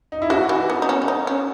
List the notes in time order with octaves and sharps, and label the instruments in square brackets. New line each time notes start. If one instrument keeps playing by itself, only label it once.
[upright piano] D#4
E4
[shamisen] F#3 [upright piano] F#4
[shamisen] E3
B3
D#4
C#4
C#4
D#4
C#4